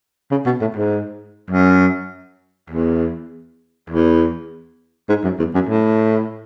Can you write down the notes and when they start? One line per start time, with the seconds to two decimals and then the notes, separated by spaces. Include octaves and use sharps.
0.31 C#3
0.46 B2
0.61 A2
0.76 G#2
1.50 F#2
2.70 E2
3.90 E2
5.09 G#2
5.24 F#2
5.39 E2
5.54 F#2
5.69 A2